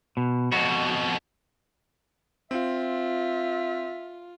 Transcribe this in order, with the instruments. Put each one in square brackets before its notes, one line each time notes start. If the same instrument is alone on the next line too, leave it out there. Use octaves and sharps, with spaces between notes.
[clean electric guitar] B2
[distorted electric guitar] F2 B2 [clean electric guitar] F#4
[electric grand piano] C4 [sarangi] F4 [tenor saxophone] E5